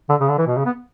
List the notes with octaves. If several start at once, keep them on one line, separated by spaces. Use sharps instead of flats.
D3
C#3
D3
E3
B2
C#3
B3